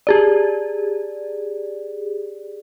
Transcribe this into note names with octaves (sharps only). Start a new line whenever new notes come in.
G4 G#4 D5